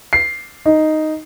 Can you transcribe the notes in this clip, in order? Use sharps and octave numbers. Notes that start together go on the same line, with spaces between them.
C7
D#4